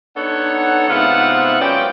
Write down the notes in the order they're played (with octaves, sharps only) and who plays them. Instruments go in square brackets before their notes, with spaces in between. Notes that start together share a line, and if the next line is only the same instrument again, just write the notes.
[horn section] B3 D4 D#4 A4 C#5 F#5
G#2 C3 B3 F4 E5 F#5
F#2 C#4 F4 D5 G5